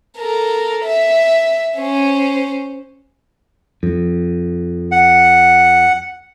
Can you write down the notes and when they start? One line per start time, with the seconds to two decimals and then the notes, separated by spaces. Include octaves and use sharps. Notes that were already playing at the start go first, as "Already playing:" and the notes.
0.18 A4 A#4
0.85 E5
1.77 C#4 C5
3.83 F2
4.92 F#5